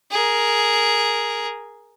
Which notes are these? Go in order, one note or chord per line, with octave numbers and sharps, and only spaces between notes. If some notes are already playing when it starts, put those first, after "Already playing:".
G#4 A#4